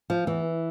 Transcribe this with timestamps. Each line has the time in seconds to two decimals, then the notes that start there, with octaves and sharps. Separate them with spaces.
0.10 F3
0.27 E2 E3